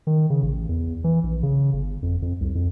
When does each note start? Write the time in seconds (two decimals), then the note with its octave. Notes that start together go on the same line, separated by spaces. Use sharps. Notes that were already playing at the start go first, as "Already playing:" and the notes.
0.07 D#3
0.30 C#3
0.43 A1
0.69 E2
1.04 E3
1.24 A#1
1.43 C#3
1.73 G1
2.03 F2
2.22 F2
2.40 C2
2.55 F2